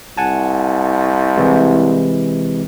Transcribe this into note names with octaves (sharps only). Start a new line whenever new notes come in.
C2 F#5 G#5 A5
C3 E3 G#3